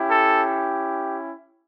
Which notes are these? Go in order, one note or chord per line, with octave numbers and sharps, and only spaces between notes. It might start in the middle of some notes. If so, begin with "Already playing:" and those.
Already playing: C#4 E4 G4
A4